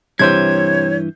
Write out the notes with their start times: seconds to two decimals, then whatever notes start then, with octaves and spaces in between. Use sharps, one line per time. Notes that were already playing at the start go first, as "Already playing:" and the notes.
0.19 G2 C3 E3 C5 C#5 G6 G#6